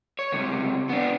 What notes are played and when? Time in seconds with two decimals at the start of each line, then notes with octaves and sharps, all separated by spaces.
0.19 C#5
0.32 C#2 C3
0.89 B3 D4